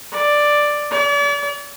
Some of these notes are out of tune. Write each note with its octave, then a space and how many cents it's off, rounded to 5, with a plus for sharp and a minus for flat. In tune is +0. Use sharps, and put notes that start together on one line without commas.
D5 +5
D5 -40